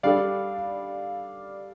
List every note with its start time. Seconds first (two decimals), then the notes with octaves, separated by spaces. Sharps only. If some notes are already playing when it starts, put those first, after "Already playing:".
0.03 G3 D4 A4 D5 F5